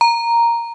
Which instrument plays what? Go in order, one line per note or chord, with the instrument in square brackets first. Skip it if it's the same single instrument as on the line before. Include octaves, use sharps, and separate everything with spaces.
[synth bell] A#5